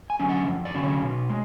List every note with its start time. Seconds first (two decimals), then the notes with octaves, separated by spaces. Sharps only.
0.10 G#5
0.20 D3 F#3 C#4
0.29 F#5
0.47 F2
0.65 D5
0.75 D3 F#3 C#4
0.83 C#5
1.02 B2
1.30 G#3